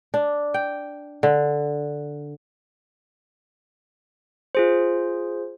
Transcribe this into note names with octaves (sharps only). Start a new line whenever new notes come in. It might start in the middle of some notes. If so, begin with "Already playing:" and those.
D4
G5
D3
F4 G#4 C5